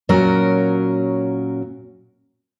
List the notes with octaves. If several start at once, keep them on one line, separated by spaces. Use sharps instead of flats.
A#2 F#3 C#4 A#4